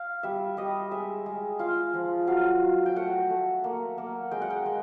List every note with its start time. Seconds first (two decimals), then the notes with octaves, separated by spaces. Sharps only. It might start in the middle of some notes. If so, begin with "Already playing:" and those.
Already playing: F5
0.23 G3 E5
0.57 G3 D#5
0.91 G#3 E5
1.26 G#3
1.59 F4 F5
1.94 F3
2.27 F#3 F5
2.62 F#3
2.86 G5
2.96 A3 F#5
3.30 A3
3.64 A#3
3.98 A#3
4.31 G#3 G5
4.42 F#5
4.50 G5
4.66 G#3